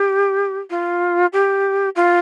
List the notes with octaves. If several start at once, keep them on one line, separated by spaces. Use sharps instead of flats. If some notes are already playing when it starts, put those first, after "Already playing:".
Already playing: G4
F4
G4
F4